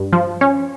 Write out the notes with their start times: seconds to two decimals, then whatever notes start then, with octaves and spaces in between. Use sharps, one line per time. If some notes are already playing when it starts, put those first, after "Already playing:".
Already playing: G2
0.13 F3
0.41 C#4